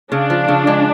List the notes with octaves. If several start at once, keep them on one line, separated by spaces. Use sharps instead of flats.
C#3 D4
F3
C#3
G#3